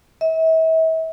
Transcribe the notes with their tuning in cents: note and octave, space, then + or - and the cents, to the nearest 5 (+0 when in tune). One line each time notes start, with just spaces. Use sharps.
E5 -40